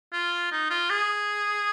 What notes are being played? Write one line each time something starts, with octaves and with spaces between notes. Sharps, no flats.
F4
D#4
F4
G#4